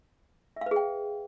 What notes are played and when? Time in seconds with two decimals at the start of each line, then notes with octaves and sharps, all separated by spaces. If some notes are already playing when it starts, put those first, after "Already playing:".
0.56 E5
0.61 F5
0.66 B4
0.71 G#4
0.76 G5